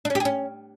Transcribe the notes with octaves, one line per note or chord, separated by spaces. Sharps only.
D4
C#4
G4
G#4
C#4